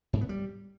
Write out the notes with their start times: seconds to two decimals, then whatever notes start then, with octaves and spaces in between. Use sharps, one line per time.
0.13 G#2
0.21 B3
0.29 G3